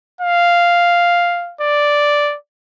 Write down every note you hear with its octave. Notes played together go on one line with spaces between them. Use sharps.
F5
D5